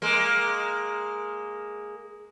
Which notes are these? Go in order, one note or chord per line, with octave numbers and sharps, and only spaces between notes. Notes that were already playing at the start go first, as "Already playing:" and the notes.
G#3 A#3